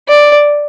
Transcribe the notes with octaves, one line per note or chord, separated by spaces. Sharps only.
D5